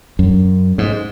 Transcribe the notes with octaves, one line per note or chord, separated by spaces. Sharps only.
F#2
G#2